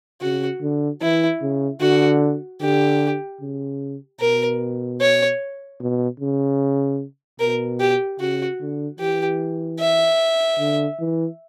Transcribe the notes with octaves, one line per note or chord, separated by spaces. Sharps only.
C#3 F#4
D3
E3 E4
C#3
D3 F#4
D3 G4
C#3
B2 A#4
C#5
B2
C#3
B2 A#4
G4
C#3 F#4
D3
E3 G4
E5
D3
E3